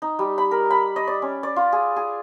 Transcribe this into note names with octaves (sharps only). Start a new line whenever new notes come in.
D#4
G3
B5
A#4
B5
D#5
D5
C#4
D5
F4
G#4
G#4